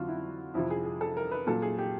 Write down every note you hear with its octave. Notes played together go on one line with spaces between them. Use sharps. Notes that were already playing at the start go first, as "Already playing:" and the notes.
Already playing: F2 D3 F#3 F4 F#4
E4
F2 C3 F3 E4
G#4
G#4
A4
A#4
B4
A#2 F#3 A4
G#4
G4